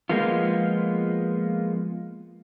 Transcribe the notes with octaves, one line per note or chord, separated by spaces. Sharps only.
F3 G#3 A#3 B3 F4